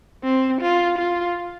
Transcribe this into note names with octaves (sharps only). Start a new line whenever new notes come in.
C4
F4
F4